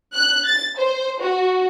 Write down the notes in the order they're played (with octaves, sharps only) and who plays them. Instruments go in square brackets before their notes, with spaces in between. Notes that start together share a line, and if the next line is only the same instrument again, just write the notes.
[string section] F#6
A6
C5
F#4